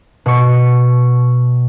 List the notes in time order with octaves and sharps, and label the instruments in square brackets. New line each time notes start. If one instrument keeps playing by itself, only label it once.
[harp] B2 C#6